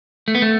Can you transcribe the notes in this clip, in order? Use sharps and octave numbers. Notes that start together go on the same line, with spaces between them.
A3
B3
A3